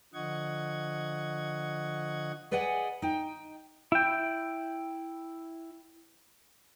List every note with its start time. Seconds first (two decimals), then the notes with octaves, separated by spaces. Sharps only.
0.14 D3 F3 D#5 F#5 C#6 G#6
2.51 G#4 B4 D5 D#5 F#5 G#5
3.02 D#4 G5
3.92 E4 G5